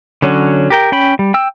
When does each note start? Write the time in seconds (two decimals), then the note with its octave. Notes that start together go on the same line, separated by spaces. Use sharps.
0.22 D3 F#3 C#4
0.70 G4 A#4 G5
0.92 C#4 G5 B5
1.19 G3
1.34 G5 E6